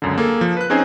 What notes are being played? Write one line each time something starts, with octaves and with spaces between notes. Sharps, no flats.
C#2 F#2 D3
A#3 G#4 A4
F3
B4 F#6
C4 C#4 D#4 G#4 C5 G#5